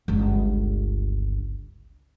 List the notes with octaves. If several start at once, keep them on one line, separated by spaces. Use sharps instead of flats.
G1 C#2